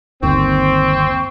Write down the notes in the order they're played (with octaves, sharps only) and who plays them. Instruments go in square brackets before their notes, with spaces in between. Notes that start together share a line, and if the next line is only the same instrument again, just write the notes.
[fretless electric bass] G1 D#2 D#3 [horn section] C4 [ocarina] C#6